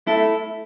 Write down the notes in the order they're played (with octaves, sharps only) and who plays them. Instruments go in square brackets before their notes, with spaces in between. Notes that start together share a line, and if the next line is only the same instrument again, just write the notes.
[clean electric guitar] A3 E4 A4